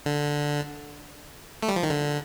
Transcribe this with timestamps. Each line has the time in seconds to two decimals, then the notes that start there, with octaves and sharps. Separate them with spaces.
0.06 D3
1.63 A3
1.68 G3
1.76 F3
1.83 D#3
1.90 D3